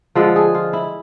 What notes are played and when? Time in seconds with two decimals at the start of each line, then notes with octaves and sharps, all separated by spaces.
0.15 D3 F3 G#3 A4
0.36 G#4
0.54 F4
0.73 E4